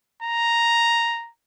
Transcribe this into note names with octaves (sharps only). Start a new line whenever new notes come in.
A#5